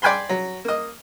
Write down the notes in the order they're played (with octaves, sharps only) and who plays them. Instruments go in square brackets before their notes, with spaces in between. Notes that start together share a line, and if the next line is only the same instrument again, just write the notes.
[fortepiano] D5 G5 G#5 B5 C6
F#3
A#3 D#5